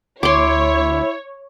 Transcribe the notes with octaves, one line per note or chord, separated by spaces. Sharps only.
D2 E4 C#5 C6 D6